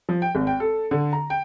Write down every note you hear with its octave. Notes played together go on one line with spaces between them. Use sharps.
F3
G5
G#1
G5
A4
D3
A#5
G5